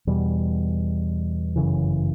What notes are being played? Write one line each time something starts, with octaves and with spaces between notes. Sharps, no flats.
E2 B2 G3
G1 F#2 C#3 E3